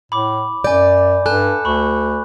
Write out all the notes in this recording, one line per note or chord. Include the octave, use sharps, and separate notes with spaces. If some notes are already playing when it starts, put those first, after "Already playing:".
A2 B5 D6
F#2 D5 G#5 G6
G2 A4 G#5 F#6
D2 B5 C#6